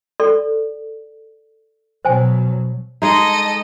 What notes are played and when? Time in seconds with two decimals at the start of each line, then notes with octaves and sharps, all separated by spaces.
0.20 A4 D5 C6
2.05 B2 F#3 C5 G#5
3.02 G#3 D#4 A4 D#5